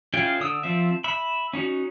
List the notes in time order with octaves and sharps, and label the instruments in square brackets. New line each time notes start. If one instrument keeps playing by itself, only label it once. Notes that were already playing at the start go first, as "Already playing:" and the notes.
[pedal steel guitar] C#4 E4 F4 G#4 G5
D3 D#6 E6
F3 C4 E5
E5 B5
C#4 D#4 F#4